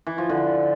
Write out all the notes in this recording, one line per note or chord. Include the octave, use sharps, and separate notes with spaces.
E3
F3
D3